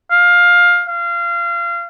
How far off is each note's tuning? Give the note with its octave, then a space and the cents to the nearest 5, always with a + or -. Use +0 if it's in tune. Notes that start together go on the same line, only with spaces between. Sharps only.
F5 +15
F5 -25